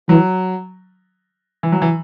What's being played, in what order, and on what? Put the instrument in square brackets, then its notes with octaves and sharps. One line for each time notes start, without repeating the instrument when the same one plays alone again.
[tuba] E3 [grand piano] F#3
[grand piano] E3
F#3
E3